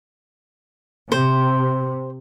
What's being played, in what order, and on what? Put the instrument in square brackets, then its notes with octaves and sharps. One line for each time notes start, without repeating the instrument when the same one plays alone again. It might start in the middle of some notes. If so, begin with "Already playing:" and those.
[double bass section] C3 [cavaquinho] C5